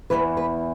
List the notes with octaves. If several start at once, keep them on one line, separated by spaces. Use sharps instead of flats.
E2 C#3 E3 B4
B4